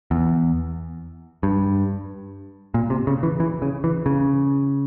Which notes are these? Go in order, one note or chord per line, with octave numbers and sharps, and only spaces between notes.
E2
G2
A#2
C3
C#3
E3
E3
C#3
E3
C#3